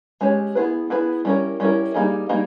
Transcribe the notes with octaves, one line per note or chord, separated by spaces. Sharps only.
G#3 C#4 G4 C#5
B3 E4 G#4 B4
B3 E4 G#4 B4
G3 C#4 E4 A#4
G3 C#4 E4 A#4
G3 A#3 D#4 G#4
G3 A#3 D#4 G#4